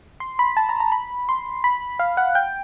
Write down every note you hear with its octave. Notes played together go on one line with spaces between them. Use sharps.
C6
B5
A5
A#5
A#5
B5
C6
B5
F5
F#5
G5